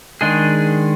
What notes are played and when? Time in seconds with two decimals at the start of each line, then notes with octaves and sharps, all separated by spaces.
0.21 D#3 G#3 D4 G#4